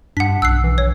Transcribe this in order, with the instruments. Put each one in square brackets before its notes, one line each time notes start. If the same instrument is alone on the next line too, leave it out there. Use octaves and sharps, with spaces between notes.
[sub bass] G2 [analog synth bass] D4 [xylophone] F#5 B6
[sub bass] B1 [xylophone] E6 F#6 C7
[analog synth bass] E3
[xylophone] C#5